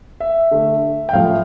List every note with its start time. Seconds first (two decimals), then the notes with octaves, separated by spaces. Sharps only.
0.20 E5
0.51 D3 A3
1.09 G5
1.13 A2 F3 A3 F5